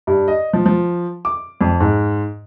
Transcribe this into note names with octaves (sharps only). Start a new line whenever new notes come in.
G2
D#5
F3
F3
D6
F2
G#2